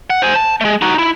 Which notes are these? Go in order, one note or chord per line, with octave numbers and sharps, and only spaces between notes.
F#5
C5 G#5
A5
G#3 A3
D#4 F#4
E4